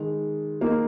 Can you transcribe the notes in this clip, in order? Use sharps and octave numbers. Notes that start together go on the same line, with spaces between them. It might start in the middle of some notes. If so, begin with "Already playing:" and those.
Already playing: D#3 G#3
A#3 D#4